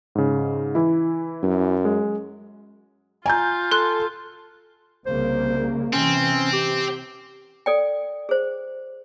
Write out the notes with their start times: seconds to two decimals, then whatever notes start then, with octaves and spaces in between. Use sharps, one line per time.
0.15 G#2 C#3
0.75 E3 E4
1.43 F#2
1.85 G#3
3.26 F4 G#5 A#5 G6
3.71 A4 C6 F#6
5.06 C2 C#3 A#3 C5
5.93 C3 E3 C4 C#4
6.53 G4
7.66 A4 D5 G5
8.29 G#4 C5